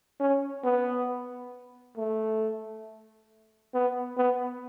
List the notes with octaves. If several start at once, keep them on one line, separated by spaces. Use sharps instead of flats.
C#4
B3
A3
B3
B3